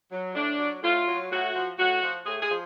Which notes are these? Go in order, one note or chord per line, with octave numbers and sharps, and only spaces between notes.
F#3
A2 D4
F#3
A2 F4
F#3
A2 F#4
F3
A2 F#4
F3
A2 G#4
G#4
F3